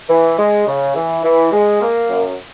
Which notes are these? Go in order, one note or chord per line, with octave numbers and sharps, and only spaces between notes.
E3
G#3
C#3
E3
E3
G#3
A#3
F#2